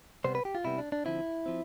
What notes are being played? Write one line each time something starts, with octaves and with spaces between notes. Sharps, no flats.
C3 G3 B3 C5
B4
G4
F4
C3 G3 B3 E4
D4
D4
D3 F3 C4 E4
F3 C4